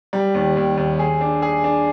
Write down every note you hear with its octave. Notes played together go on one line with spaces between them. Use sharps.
G3
D#2
D#2
D#2
G#4
D4
G#4
D4